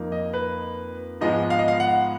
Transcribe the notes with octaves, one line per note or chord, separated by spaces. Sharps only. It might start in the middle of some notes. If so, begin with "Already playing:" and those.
Already playing: F2 F3 A#3 D#4
D#5
B4
G#2 F3 G#3 B3 D#5
F5
D#5
F5
F#5